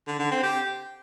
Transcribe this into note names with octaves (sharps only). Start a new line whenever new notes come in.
D3
D3
C4
G4